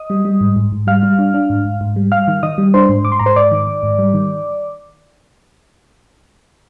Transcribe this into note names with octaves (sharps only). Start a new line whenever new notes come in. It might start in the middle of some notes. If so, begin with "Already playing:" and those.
Already playing: D#5 D#6
G3
G3
G#2
G#2
G#2
G3 F5 F6
G3
D4
D4
G#2
G#2
G#2
G3
G3 F5 F6
D#3
D#3 D#5 D#6
G3
D4 C5 C6
G#2
G#2 D6
C6
G#2 A#5
C5 C6
G#2 D5 D6
D#3
D#3
G#2
G3
D#3